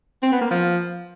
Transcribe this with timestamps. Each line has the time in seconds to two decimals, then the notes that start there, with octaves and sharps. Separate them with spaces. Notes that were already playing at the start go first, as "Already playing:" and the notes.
0.23 C4
0.32 B3
0.41 A#3
0.51 F3